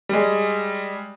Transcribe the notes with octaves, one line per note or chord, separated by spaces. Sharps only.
G3 G#3